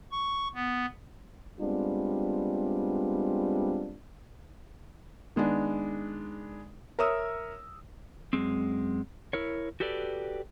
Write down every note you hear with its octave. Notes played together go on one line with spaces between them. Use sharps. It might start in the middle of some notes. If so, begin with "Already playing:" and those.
C#6
B3
G3 G#3 B3 C4 D4 F4
D#3 G#3 B3 D4
A#4 C#5 E5 D#6 E6
F#2 A#2 G#3 C4
E4 A#4 C#5
F#4 G4 A4 B4 D5